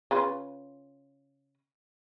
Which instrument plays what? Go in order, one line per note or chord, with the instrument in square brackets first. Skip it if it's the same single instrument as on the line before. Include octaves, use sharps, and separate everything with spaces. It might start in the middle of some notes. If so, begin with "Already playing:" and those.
[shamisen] C#3 F4 B4